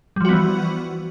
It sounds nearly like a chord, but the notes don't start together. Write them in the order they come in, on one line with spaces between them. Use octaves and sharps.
G3 F3 F#4 B3 E3